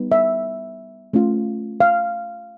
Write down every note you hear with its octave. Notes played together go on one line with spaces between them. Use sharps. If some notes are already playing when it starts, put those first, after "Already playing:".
Already playing: G3 B3 D#4
E5
A3 C#4 F4
F5